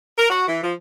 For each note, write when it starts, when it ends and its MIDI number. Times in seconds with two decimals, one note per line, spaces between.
0.18 0.28 70
0.30 0.45 66
0.48 0.63 52
0.63 0.73 53